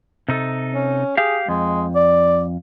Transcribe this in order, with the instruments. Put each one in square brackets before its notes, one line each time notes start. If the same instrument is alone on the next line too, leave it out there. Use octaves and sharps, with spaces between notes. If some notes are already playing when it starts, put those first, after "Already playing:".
[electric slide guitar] C3 D#4 A4
[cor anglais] C#4
[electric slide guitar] G4 F5 [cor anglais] G#4
[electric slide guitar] F2 [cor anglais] G#3
[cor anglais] D5